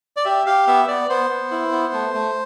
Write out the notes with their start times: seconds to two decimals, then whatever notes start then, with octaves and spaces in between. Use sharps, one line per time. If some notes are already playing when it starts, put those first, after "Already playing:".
0.17 D5
0.25 G4 E5
0.46 G4 F5
0.67 B3 E5
0.88 B3 D5
1.09 B3 C5
1.30 B3
1.51 E4
1.72 B3
1.93 A3
2.14 A3